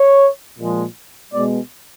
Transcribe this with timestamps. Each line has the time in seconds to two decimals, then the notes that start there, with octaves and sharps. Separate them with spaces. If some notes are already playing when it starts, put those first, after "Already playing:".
Already playing: C#5
0.59 A#2 F3 G#3
1.33 B2 G#3 D5